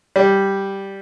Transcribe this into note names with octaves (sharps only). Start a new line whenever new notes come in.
G3